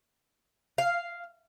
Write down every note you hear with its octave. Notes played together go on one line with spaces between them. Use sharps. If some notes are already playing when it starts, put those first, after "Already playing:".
F5